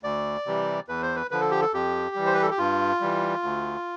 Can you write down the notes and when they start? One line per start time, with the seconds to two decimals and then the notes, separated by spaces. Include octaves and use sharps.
0.03 D2 D5
0.46 C3 E3 G3
0.88 E2 B4
1.02 C5
1.15 B4
1.31 D3 F3 B4
1.41 A4
1.51 G4
1.61 A4
1.74 F2 G4
2.15 E3 G3
2.26 C5
2.34 B4
2.42 A4
2.51 G4
2.58 G2 F4
3.01 E3 G3
3.43 D2